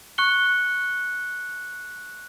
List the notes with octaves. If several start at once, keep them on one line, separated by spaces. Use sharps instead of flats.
C#6 F#6 C#7 G7